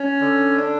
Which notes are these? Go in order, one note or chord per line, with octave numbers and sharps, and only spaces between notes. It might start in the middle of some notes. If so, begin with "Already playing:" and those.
Already playing: C#4
D3
D4